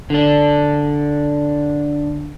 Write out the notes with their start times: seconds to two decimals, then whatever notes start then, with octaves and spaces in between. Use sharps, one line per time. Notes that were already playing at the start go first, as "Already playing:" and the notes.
0.10 D3 D4